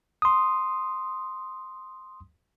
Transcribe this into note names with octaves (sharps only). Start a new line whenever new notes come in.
C6 D#6